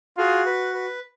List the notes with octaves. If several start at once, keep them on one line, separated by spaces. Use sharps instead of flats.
F4 F#4 G#4
B4
B4